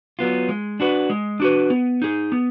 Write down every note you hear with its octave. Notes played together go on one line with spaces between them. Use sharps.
F#3 B3 F4
G#3
D4 F#4 B4
G#3
D4 F#4 B4
B3
D#4 G#4
B3